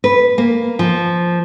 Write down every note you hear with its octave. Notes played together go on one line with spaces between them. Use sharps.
B4
A#3
F3